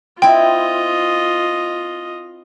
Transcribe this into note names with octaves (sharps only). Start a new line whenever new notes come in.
C4 E4 F4 D#5 G5